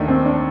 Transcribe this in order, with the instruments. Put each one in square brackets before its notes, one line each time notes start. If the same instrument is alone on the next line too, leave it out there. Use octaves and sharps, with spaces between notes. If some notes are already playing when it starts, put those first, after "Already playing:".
Already playing: [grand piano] D#2 D#3 A3 D#4 [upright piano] D4
[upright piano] C4
D4